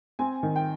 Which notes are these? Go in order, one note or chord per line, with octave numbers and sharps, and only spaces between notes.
C4 G#5
D#3
G5